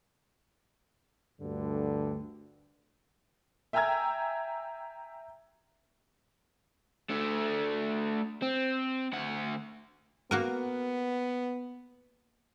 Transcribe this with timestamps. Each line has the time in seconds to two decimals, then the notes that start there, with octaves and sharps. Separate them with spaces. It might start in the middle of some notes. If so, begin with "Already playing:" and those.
1.40 D2 G2 D3
3.73 E5 G5 G#5 A#5 E6 G#6
7.09 A3 D4
8.42 C4
9.13 D2 F#5
10.31 A#3 B3 F#4 A#4